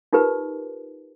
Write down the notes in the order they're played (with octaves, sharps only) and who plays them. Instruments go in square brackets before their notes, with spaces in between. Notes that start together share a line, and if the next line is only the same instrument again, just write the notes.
[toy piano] D#4 F4 G4 A#4 B4